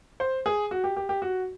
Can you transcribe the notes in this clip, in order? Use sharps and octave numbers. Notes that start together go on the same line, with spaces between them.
C5
G#4
F#4
G4
G4
G4
F#4